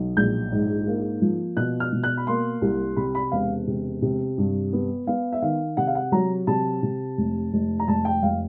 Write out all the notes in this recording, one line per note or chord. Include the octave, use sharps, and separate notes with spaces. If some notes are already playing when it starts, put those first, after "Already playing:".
Already playing: B1
A#1 G6
G#2
A#3
F3
B2 F#6
F6
B2
F#6
B5
A#3 C6
C2
C3 B5
B5
E1 F5
C3
C3
G2
B3
B3 F5
E5
D#3 F5
C3 F#5
F5
F#5
F#3 A#5
C3 A5
C3
F1
F1
A#5
F1 A5
G5
F1 F5